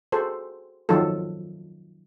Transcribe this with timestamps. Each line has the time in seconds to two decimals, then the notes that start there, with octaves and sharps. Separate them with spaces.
0.12 F#4 G#4 A4 C5
0.89 D#3 F3 F#3 D#4 F4 A4